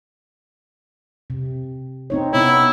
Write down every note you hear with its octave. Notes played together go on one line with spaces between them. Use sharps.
C3
C4 D#4 C#5
C3 B3 E4 C#5